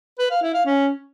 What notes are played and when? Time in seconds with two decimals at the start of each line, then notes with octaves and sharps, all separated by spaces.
0.19 B4
0.31 F5
0.42 E4
0.54 F5
0.66 C#4